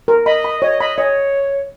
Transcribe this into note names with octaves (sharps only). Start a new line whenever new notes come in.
A#4
D#5 B5
B5
C#5 D#5
D#5 B5
C#5 D#5